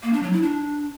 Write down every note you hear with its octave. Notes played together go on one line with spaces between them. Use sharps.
A#3
D4
F#3
E4
D4